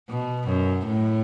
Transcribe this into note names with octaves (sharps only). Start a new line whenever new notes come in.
B2
F#2
A2